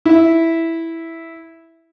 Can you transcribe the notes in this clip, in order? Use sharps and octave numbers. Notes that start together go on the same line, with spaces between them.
E4 E5